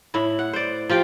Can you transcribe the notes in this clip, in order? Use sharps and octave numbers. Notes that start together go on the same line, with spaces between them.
A2 E4
F#5
C5 D5
F3 F4 G4 G5